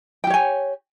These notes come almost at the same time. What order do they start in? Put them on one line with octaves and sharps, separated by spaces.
G5 G4 C#5 G#5